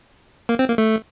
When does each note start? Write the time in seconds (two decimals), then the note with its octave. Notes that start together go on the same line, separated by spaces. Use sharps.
0.49 A#3
0.59 C4
0.68 A#3
0.78 A3